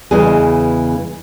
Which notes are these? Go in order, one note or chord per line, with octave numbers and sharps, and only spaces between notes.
E2 C#3 E3 G#3 G#4